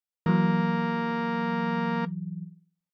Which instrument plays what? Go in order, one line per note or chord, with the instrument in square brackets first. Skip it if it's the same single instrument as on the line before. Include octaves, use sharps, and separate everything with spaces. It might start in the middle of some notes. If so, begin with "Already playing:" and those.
[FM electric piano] E3 F#3 [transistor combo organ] A#3